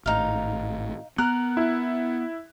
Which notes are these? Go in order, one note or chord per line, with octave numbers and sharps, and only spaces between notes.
G#1 A2 D#4 F5
B3 A#4 F#6
E4